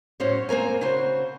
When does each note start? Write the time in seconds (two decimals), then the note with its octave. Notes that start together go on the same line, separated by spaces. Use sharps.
0.20 F#2 A2 C#4 F#4 C5 C#5
0.49 A#3 C4 A#4 G#5
0.81 C#3 F#4 C5